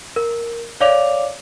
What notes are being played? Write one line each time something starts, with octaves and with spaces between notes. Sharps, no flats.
A#4
C#5 D5 F5 D6 F7